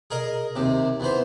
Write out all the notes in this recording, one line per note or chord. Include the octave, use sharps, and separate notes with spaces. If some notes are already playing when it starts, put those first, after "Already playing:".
G#4 A#4 D#5
D#2 C3
E2 E3 C5